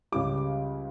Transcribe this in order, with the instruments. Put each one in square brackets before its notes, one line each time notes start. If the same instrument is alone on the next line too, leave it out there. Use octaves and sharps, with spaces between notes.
[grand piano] C#2 C#3 G3 D6